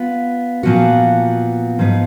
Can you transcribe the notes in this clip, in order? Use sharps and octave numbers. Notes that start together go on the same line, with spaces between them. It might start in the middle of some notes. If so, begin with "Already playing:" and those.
Already playing: B3 F4
A#2 F3 B3 F#4
G#2 F3 B3 D#4